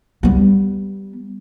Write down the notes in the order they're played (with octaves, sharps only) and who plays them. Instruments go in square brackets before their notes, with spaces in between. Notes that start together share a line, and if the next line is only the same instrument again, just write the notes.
[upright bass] G3 B3